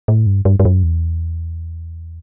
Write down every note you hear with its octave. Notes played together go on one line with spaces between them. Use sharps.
A2
G2
G2
G2
F#2
E2